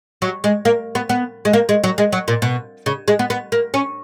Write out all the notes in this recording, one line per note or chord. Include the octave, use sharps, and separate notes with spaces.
F#3
G#3
A#3
B3
B3
G#3
A#3
G#3
F#3
G#3
F#3
A#2
B2
C#3
G#3
B3
B3
A#3
C#4